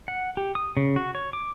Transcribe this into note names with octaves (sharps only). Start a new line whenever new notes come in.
F#5
G4
D#6
C#3
F#4
C#5
D6